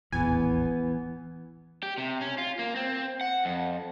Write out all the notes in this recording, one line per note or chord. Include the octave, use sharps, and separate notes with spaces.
D#1 A1 E2 E3 B3 G#5
G4
C3
C#4
F4
A#3
C4
F#5
F2